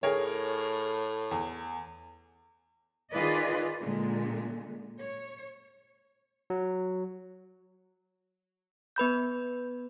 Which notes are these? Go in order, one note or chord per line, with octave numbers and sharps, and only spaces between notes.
A2 G#4 A#4 C#5
E2
D#3 F4 G#4 B4 D5 D#5
A#2 D3 G#3
C#5
F#3
B3 B4 B5 G6